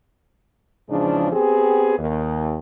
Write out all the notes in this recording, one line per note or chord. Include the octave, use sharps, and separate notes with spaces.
E2 G#2 C#3 F3 D4
B3 C4 G4 G#4
D#2